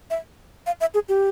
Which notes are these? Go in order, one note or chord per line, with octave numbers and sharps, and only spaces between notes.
E5
F5
E5
G#4
G4